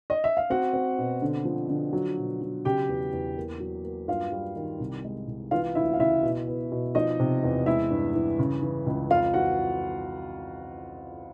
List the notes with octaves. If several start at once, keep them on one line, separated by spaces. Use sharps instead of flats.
D#5
E5
F5
C4 F#4 F#5
C4
B2
D3
F3
D3
F#3
B2
F#3
C#3 G4 G5
E2
E2
A#3
F#3
A#3
G2 F4 F5
G3
D#3
C2
G#3
C2
E3 F4 F5
D2 E4 E5
F5
C#3 E4 E5
B2
B3
B2
F3 D#4 D#5
C3
E2
G#3 E4 E5
G2
E3
C#3
E3
C#2
F2 F4 F5
E3 F#4 F#5